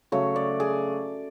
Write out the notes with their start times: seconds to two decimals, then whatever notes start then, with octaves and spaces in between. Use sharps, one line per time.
0.12 C#3 F#3 A3 C#5
0.36 D5
0.60 G#4